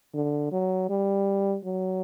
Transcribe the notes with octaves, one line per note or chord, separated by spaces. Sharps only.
D3
F#3
G3
F#3